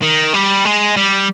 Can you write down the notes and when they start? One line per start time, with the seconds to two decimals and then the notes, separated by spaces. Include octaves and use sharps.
0.03 D#3
0.34 G3
0.65 G#3
0.97 G3